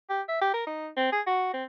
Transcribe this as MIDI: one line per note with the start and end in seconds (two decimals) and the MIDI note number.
0.10 0.22 67
0.29 0.40 76
0.42 0.53 67
0.54 0.65 70
0.67 0.89 63
0.97 1.11 60
1.12 1.21 68
1.27 1.50 66
1.54 1.64 60